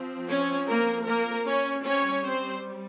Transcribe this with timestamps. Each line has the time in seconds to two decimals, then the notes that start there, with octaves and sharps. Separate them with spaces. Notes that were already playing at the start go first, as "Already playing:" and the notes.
Already playing: F3 C4
0.29 C#4 C#5
0.68 A#3 A#4
1.06 A#3 A#4
1.46 C#4 C#5
1.84 G3 C4 C#4 C#5
2.24 C4 C5